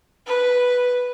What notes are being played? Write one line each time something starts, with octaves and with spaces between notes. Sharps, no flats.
B4